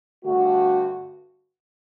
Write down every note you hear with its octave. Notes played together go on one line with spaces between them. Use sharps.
G2 D3 A3 F#4